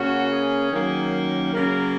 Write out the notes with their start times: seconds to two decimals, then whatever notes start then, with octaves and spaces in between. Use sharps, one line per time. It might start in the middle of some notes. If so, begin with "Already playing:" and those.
Already playing: C#3 A#3 C#4 F#4
0.31 G#4
0.71 D#3 F#3 A#3 C#4
1.52 C#3 F#3 A#3 A#4